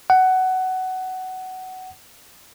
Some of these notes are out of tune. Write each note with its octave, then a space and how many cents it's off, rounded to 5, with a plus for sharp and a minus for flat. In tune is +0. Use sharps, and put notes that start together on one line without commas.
F#5 +15